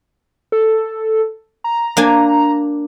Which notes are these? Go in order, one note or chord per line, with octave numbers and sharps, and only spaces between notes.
A4
A#5
A#3 D4 G#5